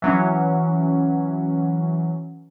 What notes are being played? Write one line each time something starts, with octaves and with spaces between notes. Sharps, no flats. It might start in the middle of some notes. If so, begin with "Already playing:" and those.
E3 F#3 C#4